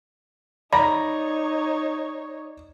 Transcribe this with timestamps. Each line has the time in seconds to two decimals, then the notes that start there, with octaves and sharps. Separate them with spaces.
0.73 D#4 C#5 D5 A#5 B5